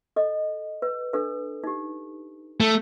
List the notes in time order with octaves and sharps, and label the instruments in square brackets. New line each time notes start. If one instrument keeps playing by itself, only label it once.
[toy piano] A4 D#5
B4
D4 A4 B4
D#4 G4
[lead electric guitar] A3